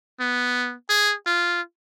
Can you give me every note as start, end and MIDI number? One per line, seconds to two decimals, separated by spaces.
0.21 0.74 59
0.90 1.14 68
1.26 1.61 65